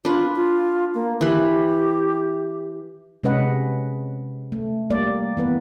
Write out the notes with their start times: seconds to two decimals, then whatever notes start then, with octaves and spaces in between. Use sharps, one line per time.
0.05 D4 F4 B4
0.36 F4
0.95 A#3
1.21 E3 G4 B4
3.23 C3 G#3 C#4 B4 D#5 F#5
4.52 A3
4.90 G3 A#3 D5
5.37 E3 B3 B4